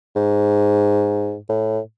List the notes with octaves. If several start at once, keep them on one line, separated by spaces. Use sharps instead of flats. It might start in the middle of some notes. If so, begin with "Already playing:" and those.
G#2
A2